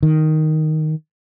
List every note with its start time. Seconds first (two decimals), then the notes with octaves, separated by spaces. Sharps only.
0.03 D#3